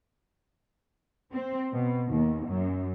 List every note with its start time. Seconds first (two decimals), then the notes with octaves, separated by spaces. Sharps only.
1.33 C4
1.73 B2
2.08 D#2
2.46 F#2